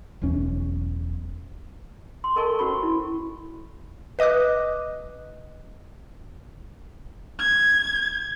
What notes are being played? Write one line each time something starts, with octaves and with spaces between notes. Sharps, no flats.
E1 B1 E2 C#4
C6
A4 A#4 D#5 G#5 A5 C#6
C#4 F#4 C5 B5 C#6
E4
B4 D#5 D6 D#6 F#6
G#6